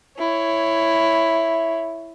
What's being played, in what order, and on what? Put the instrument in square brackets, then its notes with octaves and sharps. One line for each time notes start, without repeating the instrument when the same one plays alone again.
[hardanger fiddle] E4 C#5